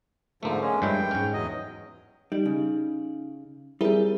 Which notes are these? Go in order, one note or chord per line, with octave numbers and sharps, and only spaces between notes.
G#2 D3 F3 A3 A#3
G#3 C#4
G2 G#3 E4 G5
G#2 C#4
E2 F#3 D#5
G3 D#4
C#3
G3 C4 E4 G#4 A#4